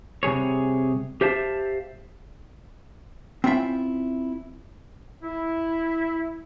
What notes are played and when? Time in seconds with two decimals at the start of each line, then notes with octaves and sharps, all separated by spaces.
0.23 C3 G3 G#4 C#5
1.21 G4 C5 E5 F5 A5
3.44 C4 C#4 E4 F4 E5 G5
5.22 E4